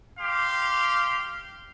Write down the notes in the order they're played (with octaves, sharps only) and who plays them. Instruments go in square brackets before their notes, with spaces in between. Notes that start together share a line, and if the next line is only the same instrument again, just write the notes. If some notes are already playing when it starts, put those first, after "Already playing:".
[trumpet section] G4 F5 C6